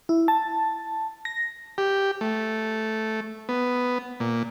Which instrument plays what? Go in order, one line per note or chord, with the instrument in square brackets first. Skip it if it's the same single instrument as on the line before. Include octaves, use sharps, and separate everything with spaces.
[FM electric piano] E4
A5
A#6
[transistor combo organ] G4
A3
B3
A#2